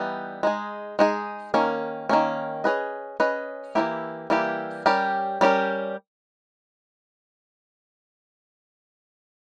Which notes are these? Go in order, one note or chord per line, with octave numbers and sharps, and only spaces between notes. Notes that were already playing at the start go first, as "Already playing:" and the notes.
Already playing: E3 G3 B3 D#4
G#3 D#4 G#4
G#3 D#4 G#4
D#3 A#3 C#4
D#3 A#3 C#4
C#4 G#4 B4 D#5
C#4 G#4 B4 D#5
E3 G3 A#3 E4 G4
E3 G3 A#3 E4 G4
G3 C#4 G4 A#4
G3 C#4 G4 A#4